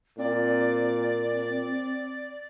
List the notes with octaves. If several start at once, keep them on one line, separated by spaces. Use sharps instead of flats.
A#2 C4 D5